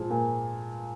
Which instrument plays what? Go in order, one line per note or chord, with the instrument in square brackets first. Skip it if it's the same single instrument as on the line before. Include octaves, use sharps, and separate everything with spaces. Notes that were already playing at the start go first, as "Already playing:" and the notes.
Already playing: [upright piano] A#2 F3 G#3
A#2